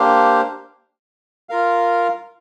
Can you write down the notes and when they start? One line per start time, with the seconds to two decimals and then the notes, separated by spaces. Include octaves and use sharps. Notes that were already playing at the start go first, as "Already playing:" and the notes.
Already playing: A#3 D4 G4 C5 F5
1.49 F4 A#4 F5